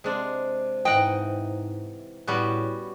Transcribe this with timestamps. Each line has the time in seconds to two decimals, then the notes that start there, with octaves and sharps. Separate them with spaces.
0.04 C3 G#3 C4 D4
0.85 G#2 E3 D#4 D#5 F#5 G5
2.27 A2 G3 B3 C#4 F#4